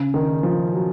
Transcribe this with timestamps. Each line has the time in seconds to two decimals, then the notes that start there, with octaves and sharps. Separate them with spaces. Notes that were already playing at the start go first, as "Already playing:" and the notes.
Already playing: C#3
0.14 D#3
0.43 F3
0.73 F#3